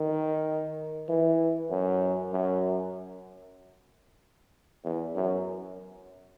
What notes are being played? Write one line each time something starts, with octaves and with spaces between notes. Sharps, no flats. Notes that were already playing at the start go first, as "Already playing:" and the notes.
Already playing: D#3
E3
F#2
F#2
E2
F#2